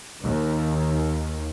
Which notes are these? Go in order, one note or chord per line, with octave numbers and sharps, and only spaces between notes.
D#2 D#3